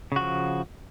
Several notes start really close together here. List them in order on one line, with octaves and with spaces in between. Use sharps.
C#3 F#4 F3